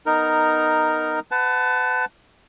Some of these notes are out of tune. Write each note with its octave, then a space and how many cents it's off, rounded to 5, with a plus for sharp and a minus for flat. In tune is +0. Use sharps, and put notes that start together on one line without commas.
B3 +0 D#4 +0 A#4 -5
B4 +30 F#5 +0 A5 +0